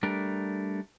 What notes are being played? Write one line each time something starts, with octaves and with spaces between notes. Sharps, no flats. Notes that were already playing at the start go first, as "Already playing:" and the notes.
G3 A3 D4 A#4